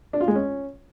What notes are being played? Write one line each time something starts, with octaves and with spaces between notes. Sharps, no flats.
D4
F4
G#3
C#4